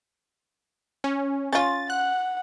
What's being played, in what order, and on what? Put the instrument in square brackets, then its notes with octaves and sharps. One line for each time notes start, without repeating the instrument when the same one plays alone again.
[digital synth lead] C#4
[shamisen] C#4 F4 [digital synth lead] A6
[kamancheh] F#5 [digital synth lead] F#6